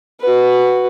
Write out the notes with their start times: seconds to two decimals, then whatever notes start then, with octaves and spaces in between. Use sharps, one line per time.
0.20 F#4 B4